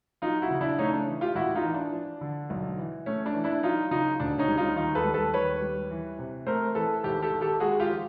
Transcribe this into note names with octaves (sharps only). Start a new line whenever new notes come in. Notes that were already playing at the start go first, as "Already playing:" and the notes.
F#3 D#4 F4
E4 F#4
C#3
D4 E4
A3 C#4 D#4
D4
E3
F4 G4
A1 E4 F#4
D#4 F4
E3
D4
F3
D3
B1
E3
A3 C#4
D4
E3
D4 E4
F#3 D#4 F4
C#3 D#4 F4
D2 D4
C#4 D#4
G3
D#4 F4
D#2 D#4 F4
A4 B4
G3
A4 B4
D#2 B4 C#5
G3
E3
C3
A3 A#4 C5
E3 A4 B4
G#1 G4 A4
G4 A4
D#3
G4 A4
G#3 F#4 G#4
F4 G4
F3